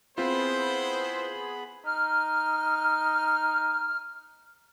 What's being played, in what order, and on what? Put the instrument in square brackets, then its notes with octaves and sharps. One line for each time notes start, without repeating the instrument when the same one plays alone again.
[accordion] B3 G#4 B5 [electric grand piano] C4 F4 [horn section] E4 B4 C5
[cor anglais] D#4 [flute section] F6